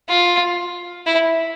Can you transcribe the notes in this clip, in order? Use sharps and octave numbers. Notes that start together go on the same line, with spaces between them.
F4
E4